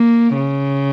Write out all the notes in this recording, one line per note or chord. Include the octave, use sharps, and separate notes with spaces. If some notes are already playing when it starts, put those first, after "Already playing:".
Already playing: A#3
C#3